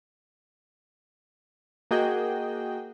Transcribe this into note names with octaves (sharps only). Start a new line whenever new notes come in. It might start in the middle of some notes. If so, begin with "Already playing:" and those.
A#3 F#4 G#4 D#5 G5